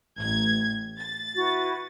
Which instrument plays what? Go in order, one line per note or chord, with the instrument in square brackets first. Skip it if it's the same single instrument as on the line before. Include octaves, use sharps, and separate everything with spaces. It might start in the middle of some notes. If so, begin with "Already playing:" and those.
[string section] A1 G#6
A6
[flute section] E4 F#4 B4